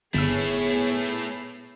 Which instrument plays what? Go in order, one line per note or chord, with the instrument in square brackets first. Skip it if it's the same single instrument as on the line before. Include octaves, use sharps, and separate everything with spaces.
[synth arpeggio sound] G1 E6 [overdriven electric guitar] A3 E4 [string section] B3 G#4 C#5